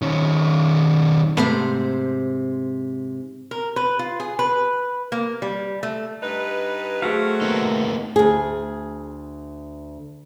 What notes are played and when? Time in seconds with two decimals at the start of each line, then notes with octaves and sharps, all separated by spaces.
0.02 D#3 C#4
1.37 G#2 C3 A3 B3 C5
3.51 A#4
3.76 B4
3.99 F4
4.20 G#4
4.39 B4
5.12 A#3
5.42 G3
5.83 A3
6.22 G2 D#4 B4
7.02 F#3 A3 C4 F#4 G#4 A4 F5 B6
7.41 A#3 B3 D#4
8.16 D2 G#4